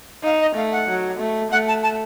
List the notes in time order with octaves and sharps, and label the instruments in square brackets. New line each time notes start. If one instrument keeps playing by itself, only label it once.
[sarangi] D#4 [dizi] F5
[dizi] D#5
[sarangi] A3 [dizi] F5
[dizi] F#5
[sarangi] F#3
A3
[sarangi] A3 [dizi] F#5
[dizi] A5
A5